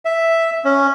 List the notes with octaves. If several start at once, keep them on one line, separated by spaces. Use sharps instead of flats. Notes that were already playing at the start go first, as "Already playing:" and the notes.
E5
C#4